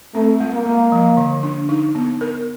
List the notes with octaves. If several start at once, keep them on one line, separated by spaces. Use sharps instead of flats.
A3 C4
G#3
A#3
G#3
F3
D3
D4
D#4
B3
A#4